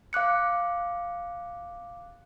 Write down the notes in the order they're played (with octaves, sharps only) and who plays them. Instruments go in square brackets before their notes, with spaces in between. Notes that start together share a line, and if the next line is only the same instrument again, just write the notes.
[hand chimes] F5 D6 F#6 C#7